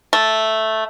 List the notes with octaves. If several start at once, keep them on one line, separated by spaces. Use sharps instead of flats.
A3